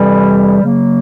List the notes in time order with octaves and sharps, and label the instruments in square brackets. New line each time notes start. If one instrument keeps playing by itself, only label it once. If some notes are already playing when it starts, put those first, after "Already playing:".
Already playing: [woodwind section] F2 C3 E3 G3
C#3 F#3 A#3